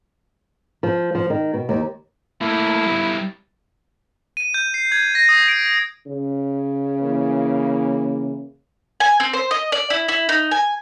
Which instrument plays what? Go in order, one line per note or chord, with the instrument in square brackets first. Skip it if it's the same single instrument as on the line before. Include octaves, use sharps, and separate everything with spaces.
[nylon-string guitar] F3
F3
D#3
B2
D#2
[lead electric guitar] A3 A#3 [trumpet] E4
[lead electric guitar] G3 B3
[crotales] D#7
G6
C7
G#6
A#6
D#6
D7
[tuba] C#3
[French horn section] E3 A#3
[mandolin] G#5
C4
C5
D#5
D5
E4
E4
D#4
G#5